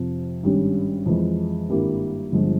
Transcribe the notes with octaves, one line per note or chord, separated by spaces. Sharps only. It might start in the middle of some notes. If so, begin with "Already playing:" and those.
Already playing: F2 C3 F3
G#1 G2 G3 C#4
F2 E3 G#3
G#1 G2 G3 A#3 E4
G1 G2 F3 G#3